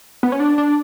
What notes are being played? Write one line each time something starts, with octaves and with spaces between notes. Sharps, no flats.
B3
C#4
D4
D4